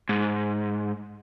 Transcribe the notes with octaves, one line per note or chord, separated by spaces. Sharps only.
G#2